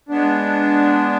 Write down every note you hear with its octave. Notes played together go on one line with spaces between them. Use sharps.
G#3 B3 D4